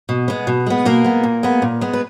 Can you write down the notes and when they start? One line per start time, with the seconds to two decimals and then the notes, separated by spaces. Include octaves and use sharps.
0.09 B2
0.28 G#3 B3
0.47 B2
0.67 G#3 B3
0.85 B2 A#3 A#4
1.05 G#3 B3
1.23 A#2
1.43 G#3 B3
1.62 A#2
1.81 G#3 B3
1.93 B4